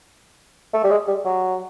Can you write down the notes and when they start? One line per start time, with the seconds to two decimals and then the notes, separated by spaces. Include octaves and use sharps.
0.74 A3
0.84 G3
0.91 G#3
1.08 G3
1.25 F#3